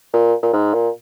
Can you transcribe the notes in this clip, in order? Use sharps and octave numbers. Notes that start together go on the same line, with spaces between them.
A#2
A#2
G#2
A#2